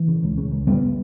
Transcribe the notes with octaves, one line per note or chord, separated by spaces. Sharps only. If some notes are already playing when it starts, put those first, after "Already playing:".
Already playing: E3
C#3
C#2
C#3
C#2
F#1 G3 B3